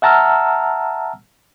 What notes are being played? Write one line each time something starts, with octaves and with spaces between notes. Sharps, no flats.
E5 F#5 A5 A#5 E6 F6